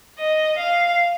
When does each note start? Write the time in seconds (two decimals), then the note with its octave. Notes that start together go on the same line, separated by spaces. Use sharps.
0.18 D#5
0.57 F5